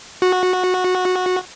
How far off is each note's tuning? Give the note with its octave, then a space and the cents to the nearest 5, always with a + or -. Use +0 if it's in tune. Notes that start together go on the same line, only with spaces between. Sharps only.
F#4 -15